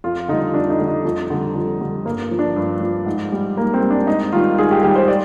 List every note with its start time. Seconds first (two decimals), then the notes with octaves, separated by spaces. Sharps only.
0.04 F2 F4
0.28 D3 D#4
0.33 G3
0.53 F2 D4
0.70 D#4
0.79 D3 G3
0.88 D#4
1.05 F2
1.30 D3 G3
1.55 F2
1.80 D3 G3
2.06 G2 A#3
2.31 F3
2.39 D4
2.56 G2
2.81 F3
3.06 G#2
3.32 G3
3.56 G#2 A#3
3.74 C4
3.82 G3
3.90 D4
4.07 G#2 D#4
4.32 D#3 G3 F4
4.57 G#2 G#4
4.71 G4
4.83 D#3 G3 G4
4.96 C5
5.08 D5